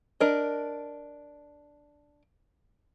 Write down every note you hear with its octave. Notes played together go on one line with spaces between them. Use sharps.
D4 A#4 D#5